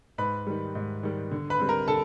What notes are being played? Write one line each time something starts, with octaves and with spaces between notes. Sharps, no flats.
G#2 B4 B5
D#3 G3
G#2
D#3 G3
D3
B4 B5
G3 C4
A#4 A#5
D3 A4 A5